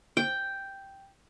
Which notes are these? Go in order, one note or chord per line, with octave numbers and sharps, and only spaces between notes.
G5